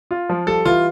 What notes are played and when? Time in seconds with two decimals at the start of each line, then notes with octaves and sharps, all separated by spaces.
0.11 F4
0.30 F3
0.47 G3 A4
0.65 E3 F4